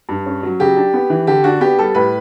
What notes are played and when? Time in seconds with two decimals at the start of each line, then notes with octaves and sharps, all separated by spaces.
0.09 G2
0.26 C#4
0.43 F#3
0.60 C#3 G4
0.76 D4
0.94 B3
1.10 E3
1.27 D3 G4
1.44 D4 F#4
1.61 B3 G4
1.79 G3 A4
1.95 A2 B4